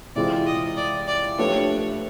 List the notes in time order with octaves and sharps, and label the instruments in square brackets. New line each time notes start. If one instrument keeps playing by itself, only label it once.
[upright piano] C3 E3 G#3 C4 F4 [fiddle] D5
[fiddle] D#5
D5
D5
[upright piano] F3 A3 D4 G4 B4 [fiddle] C#5